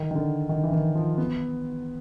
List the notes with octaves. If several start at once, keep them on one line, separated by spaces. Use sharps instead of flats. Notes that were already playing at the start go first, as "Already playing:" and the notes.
Already playing: D#3
D#3
D3
D#3
E3
D#3
F3
B3